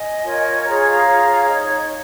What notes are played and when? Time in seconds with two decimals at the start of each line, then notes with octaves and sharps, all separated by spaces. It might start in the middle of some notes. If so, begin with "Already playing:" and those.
Already playing: D#5 G#5
0.23 F4 A#4 C#5
0.64 F4 G#4 C#5 A#5
0.77 G#5
0.90 F5 A#5
1.06 F4 G#4 C#5
1.48 D#4 C#5 D#5
1.62 C#5
1.77 D#5